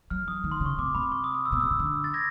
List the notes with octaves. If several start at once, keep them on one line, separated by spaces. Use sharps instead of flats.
F#3 F6
E3 D#6
D#3
C6
C#3
C#6
C3 D6
C3 B5
C#6
D#6
D#6
E6
B2 D#6
C3 E6
C#3
D3
A6
G#6 A#6